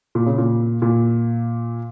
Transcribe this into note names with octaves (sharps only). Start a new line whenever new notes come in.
A#2
C#3
A#2
A#2